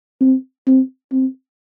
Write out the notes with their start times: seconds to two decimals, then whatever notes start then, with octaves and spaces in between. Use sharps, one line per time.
0.21 C4
0.67 C4
1.12 C4